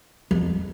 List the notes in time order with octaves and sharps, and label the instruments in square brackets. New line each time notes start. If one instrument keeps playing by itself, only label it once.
[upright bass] F2